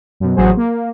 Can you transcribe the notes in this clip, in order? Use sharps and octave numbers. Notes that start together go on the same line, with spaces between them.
F#2 B2
A1 F#3 F#4 G#4 C5
A#3